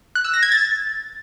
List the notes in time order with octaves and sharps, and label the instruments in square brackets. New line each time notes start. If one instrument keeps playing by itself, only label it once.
[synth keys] F#6
E6
A#6
G#6
A6